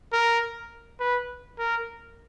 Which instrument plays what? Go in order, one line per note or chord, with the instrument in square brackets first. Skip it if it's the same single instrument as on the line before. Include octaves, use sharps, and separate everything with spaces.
[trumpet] A#4
B4
A#4